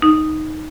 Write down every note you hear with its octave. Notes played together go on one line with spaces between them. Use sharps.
D#4